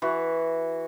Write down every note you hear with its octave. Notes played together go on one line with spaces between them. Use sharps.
E3 F#4